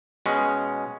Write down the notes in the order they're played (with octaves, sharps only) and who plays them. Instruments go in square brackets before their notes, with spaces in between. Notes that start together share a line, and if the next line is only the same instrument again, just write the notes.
[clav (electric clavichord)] B2 G#3 C#4